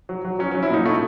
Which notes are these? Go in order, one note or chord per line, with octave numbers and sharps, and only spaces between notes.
F#3
F#3
F#3 C#4
F#3 C#4
E4
A#2 D#4
A3